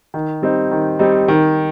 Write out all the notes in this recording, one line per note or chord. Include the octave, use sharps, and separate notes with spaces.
D#3
G3 C4 D#4
D#3
G3 C4 D#4
D#3